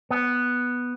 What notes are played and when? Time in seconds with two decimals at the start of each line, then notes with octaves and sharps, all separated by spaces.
0.11 B3